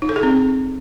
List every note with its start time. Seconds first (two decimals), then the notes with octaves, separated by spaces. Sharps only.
0.02 D#4
0.09 A4
0.16 G#4
0.23 C4